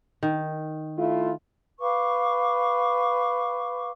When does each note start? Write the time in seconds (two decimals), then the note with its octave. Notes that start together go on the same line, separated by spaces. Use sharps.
0.23 D#3
0.98 A3 E4 F4
1.81 B4 F5 C#6 D6